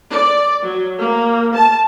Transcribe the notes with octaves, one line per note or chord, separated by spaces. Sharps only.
D5
F#3
A#3
A5